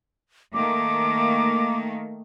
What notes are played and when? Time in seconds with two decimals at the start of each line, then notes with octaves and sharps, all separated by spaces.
0.54 D#3 A3 A#3 D6